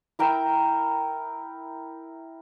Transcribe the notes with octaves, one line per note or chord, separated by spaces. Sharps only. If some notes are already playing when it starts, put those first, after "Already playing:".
E4 A#4 G5 E6